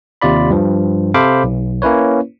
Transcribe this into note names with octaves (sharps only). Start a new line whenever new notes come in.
D#2 C3 F4 D5 B5
G2 F3
C3 A4 C5 F5 B5 D6
B1
A#3 C#4 E4 B4 C#5